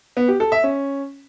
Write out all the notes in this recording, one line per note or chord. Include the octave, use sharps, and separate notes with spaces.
B3
G4
A4
E5
C#4